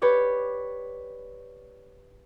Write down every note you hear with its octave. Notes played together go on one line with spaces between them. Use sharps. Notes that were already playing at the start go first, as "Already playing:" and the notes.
G4 B4 C#5 D5